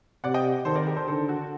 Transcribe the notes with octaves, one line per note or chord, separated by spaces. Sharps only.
C3 D5 F#5
D#5 G5
D#3 A4 C5
A#4 D5
G4 A#4
A4 C5
D3 A4 C5
F#4 A4